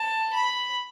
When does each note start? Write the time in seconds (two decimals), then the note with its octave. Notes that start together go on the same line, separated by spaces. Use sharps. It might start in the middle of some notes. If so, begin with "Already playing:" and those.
Already playing: A5
0.33 B5